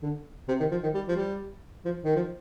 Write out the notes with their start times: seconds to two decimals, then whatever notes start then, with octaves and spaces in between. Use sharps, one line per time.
0.02 D3
0.48 C3
0.60 D#3
0.71 F3
0.83 D#3
0.94 G3
1.08 F3
1.16 G3
1.85 F3
2.04 D#3
2.16 F3